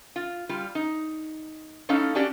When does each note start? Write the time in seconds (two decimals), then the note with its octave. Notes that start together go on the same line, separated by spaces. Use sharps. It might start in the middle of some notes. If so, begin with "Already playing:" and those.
0.16 F4
0.49 G3 F4
0.75 D#4
1.89 A2 C#4 D#4 A4 F5 A5
2.15 C#4 D4 F#4 G4 D5